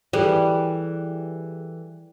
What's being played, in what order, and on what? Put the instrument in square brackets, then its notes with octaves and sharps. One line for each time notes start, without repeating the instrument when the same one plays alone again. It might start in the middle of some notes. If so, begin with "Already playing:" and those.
[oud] E3 [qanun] G3 [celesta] G#4 A4